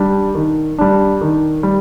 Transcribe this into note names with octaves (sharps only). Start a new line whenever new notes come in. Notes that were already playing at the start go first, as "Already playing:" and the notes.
Already playing: G3 D4
D#3
G3 D4
D#3
G3